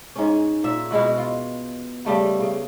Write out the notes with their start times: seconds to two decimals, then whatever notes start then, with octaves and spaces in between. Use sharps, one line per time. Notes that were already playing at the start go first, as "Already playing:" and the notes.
0.16 G#2 C#4
0.64 A#2 E5
0.91 B2 G#3 E4 F#4
1.18 F4
2.05 C#3 G3 A3 B3
2.40 C#3